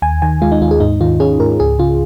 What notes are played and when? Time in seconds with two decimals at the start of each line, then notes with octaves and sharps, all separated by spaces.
0.02 D#2 G#5
0.22 D#3 G#5
0.42 G#3 F4
0.52 D#4
0.62 D#2 F4
0.71 G#4
0.80 G#2 D#4
1.01 D#3 F4
1.20 C#4 G#4
1.40 G#2 A#4
1.60 C#2 G#4
1.79 C#3 F4